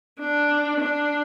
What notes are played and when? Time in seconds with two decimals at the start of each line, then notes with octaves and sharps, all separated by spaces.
0.19 D4
0.80 D4